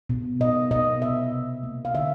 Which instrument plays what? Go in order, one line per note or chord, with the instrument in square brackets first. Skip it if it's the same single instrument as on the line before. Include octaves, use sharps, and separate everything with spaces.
[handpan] B2
B2 D#5
B2 D#5
C3 E5
C3
A#3
F5
D3 E5